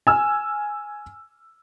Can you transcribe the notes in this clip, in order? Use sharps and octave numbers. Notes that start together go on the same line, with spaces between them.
G#5 E6 F6